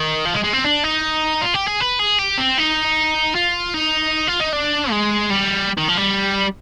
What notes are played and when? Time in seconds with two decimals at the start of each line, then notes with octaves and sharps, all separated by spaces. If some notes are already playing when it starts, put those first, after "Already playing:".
Already playing: D#3
0.25 F3
0.34 G#3
0.44 G#3
0.53 C4
0.64 D4
0.83 D#4
1.41 F4
1.54 G4
1.67 G#4
1.80 B4
1.99 G#4
2.19 G4
2.38 C4
2.58 D#4
3.35 F4
3.74 D#4
4.28 F4
4.40 D#4
4.52 D4
4.90 G#3
5.30 G3
5.78 D#3
5.89 F3
5.98 G3